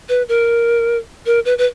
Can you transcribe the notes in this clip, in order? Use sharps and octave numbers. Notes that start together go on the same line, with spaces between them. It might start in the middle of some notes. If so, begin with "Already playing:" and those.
B4
A#4
A#4
B4
B4